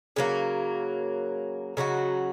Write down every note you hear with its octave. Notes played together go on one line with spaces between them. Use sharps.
C#3 F#3 A#3
C#3 F#3 D#4 F#4